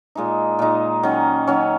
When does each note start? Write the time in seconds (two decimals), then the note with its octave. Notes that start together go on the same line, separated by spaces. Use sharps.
0.15 A#2 G#3 D#4
0.59 A#2 G#3 D#4
1.03 D#3 F#3 C#4
1.47 D#3 F#3 C#4